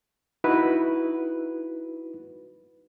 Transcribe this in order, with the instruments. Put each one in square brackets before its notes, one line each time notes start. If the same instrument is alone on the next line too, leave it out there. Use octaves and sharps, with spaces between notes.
[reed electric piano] D#4 E4 F#4 B4